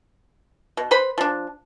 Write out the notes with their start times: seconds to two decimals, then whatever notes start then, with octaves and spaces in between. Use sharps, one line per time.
0.77 B2
0.91 B4 C5 B5
1.18 F3 D4